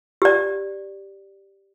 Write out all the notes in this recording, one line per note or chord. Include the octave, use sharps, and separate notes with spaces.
G4 D5